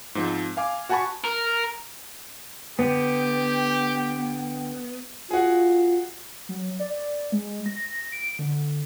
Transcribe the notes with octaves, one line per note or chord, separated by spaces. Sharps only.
G#2 F3 C4
F5 G#5 D6
F#4 F#5 G#5 A5 B5 C#6
A#4
D3 B3 G4 G5
F4 F#4 G#4
F#3
D5
G#3
A#6
D7
D3